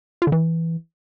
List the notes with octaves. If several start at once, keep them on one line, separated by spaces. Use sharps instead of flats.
F4
D3
E3